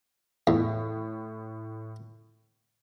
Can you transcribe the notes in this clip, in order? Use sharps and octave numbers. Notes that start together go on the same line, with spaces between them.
E2 A2